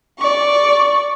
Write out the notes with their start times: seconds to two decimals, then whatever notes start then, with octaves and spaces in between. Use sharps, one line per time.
0.19 D5 C#6